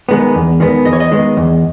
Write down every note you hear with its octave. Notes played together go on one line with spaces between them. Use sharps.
D#3 G#3 B3
E2
D#3 G#3 B3
E2 D#5
C#5
D#5
D#3 G#3 B3
E2